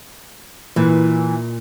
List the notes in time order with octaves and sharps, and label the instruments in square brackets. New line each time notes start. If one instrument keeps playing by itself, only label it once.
[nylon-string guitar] A#2 [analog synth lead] E3